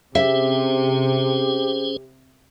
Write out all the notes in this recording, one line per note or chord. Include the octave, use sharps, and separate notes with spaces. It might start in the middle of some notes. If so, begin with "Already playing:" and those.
C3 C#4 G4 G#4 C5 E5